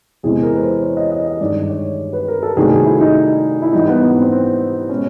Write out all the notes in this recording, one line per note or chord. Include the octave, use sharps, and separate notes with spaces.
E2 C3 E3 G#3 G#4
A#4
B4
C5
C#5
D#5
D#5
D#5
G2 D#3 G#3 D5
C#5
B4
A#4
A4
C2 C3 D#3 F#3 A3 G#4
A4
E4
D#4
E4
G#2 E3 G3 D#4
B3
B3
C4
C4
B2 G#3 C#4